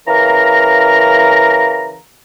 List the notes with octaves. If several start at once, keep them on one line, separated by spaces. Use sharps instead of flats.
C#3 E3 A#4 F5 A#5